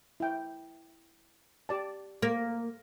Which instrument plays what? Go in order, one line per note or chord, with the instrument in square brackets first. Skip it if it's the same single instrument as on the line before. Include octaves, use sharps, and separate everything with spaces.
[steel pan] E4 G5
G4 D5 A5
[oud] A#3